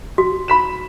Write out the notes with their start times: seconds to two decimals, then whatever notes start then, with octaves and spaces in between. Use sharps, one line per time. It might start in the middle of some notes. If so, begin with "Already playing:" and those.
0.18 F#4
0.48 B5 B6 E7